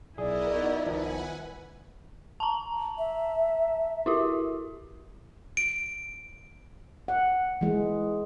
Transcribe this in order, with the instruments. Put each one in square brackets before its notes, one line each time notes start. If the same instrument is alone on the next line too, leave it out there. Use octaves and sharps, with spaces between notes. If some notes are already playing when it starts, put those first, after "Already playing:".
[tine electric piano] B1 G#4 [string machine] B3 A#4 D#5 [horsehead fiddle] E4 [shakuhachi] D5
[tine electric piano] D#4 F#4
[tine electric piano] C2 D#3 F3 [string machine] B4 F#5 G#5
[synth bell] A5 A#5
[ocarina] E5
[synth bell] E4 F#4 G4
[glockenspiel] D7
[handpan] F#5
E3 G#3